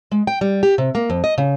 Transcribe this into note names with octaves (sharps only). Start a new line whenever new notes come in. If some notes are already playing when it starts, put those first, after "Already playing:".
G#3
G5
G3
G4
C3
A#3
F2
D#5
C#3